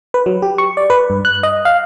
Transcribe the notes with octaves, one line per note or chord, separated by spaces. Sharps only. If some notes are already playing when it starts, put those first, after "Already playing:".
B4
F#3
G4
C#6
D5
B4
G2
F#6
D#5
F5